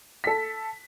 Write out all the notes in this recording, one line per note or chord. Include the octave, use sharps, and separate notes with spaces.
A4 B6